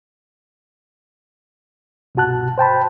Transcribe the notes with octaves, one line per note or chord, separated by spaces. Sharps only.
C2 G2 B2 F#4 A5 F#6
C5 G5 A5 B5